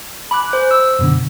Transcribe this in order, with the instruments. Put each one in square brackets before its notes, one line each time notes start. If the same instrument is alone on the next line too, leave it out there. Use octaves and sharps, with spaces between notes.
[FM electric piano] G#5 D6 F#6 [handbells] B5
[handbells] C5
E6
[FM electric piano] F#2 B2 D3